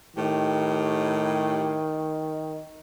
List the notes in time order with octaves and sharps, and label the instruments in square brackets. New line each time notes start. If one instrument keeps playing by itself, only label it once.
[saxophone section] A2 G4 [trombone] D#3